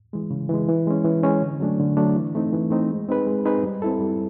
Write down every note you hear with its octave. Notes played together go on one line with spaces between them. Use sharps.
E3 G#3
C#3
E3 G#3
E3
G#3 C#4
E3
G#3 C#4
D3
F#3 A3 D4
D3
F#3 A3 D4
E3
A3 C4 D#4
E3
A3 C4 D#4
G#3
C4 D#4 G#4 B4
G#3
C4 D#4 G#4 B4
G3
C4 E4 A4
G3